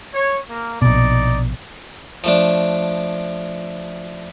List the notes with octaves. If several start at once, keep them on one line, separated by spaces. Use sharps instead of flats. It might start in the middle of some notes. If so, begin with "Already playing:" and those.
C#5
A#3
A#1 B2 D#4 D5
F3 A3 D4